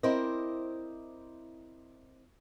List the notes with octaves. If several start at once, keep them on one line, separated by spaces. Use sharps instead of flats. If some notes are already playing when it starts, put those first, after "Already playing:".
C4 E4 A#4 C5 D5 D#5